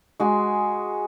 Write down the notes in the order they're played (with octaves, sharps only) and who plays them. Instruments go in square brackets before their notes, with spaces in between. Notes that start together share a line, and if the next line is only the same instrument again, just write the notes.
[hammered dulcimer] G#3 F#4 G#4